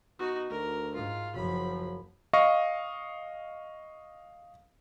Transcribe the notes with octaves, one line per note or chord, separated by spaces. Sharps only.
B2 D#4 F#4
D2 A#4
G#2 F4
F#1 F3 F#3 B5
D#5 F5 C#6